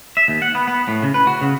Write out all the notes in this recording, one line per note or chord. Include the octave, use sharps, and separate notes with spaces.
E5
D#2
F#5
B3
B3
A2
C#3
B4
F#4
C#3